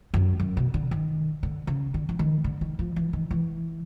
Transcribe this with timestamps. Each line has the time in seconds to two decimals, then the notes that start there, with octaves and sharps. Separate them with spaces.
0.14 F#2
0.40 F#2
0.57 B2
0.74 D3
0.91 D#3
1.43 D3
1.67 C#3
1.94 D3
2.09 E3
2.19 D#3
2.44 D3
2.61 D#3
2.79 F3
2.96 E3
3.13 D#3
3.31 E3